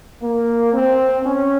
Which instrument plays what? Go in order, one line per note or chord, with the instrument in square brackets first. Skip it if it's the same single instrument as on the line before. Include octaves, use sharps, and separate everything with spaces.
[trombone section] A#3
C4
C#4